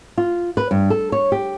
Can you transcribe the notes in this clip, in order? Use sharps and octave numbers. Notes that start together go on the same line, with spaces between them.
F4
B4
G2
A4
C#5
G4